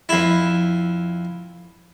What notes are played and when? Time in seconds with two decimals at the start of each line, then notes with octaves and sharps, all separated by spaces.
0.09 F2 E4